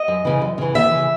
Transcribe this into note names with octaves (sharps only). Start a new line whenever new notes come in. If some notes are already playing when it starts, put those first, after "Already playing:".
Already playing: D#5
F#2
C#3 E3
F#2
C#3 E3
D#2 E5
C#3 E3